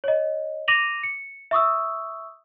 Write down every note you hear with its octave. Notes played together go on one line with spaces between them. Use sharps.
C#5 D#5
D6 A#6 D#7 F7 F#7
C#7
E5 C#6 D#6 E6